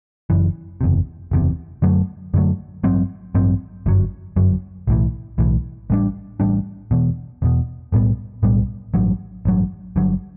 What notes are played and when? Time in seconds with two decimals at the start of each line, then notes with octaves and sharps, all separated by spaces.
0.30 F#1 F#2 E3
0.81 F#1 E2 C3
1.31 F#1 E2 C3
1.82 F#2 D3 F#3 A3
2.34 F#2 D3 F#3 A3
2.83 A1 G2 F#3 C4
3.35 A1 G2 F#3 C4
3.86 G1 F#2 F#3
4.36 G1 F#2 F#3
4.87 B1 A2 E3
5.38 B1 A2 E3
5.90 A1 A2 G3 D4
6.40 A1 A2 G3 D4
6.91 E1 E2 B2
7.42 E1 E2 B2
7.92 B1 A2 G3 B3
8.43 B1 A2 G3 B3
8.94 A1 G2 F#3
9.45 A1 G2 F#3
9.96 G1 G2 F#3